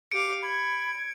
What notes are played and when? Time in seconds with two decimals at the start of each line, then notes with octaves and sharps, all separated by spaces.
0.12 G4 F5 D6 C#7 D7
0.42 B5 G#6